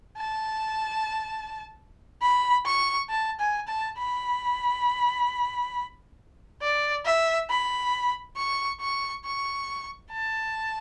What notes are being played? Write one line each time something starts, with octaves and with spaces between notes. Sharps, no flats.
A5
B5
C#6
A5
G#5
A5
B5
D5
E5
B5
C#6
C#6
C#6
A5